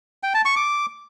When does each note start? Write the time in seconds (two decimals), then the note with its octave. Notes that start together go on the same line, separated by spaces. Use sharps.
0.23 G5
0.34 A5
0.45 C#6
0.56 D6